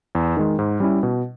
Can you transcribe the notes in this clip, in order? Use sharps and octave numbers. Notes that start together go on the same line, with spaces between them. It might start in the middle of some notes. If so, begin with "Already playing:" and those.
E2
D#3 G#3
G#2
G3 C#4 E4
B2